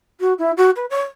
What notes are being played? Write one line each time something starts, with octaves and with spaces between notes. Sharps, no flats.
F#4
E4
F#4
B4
C#5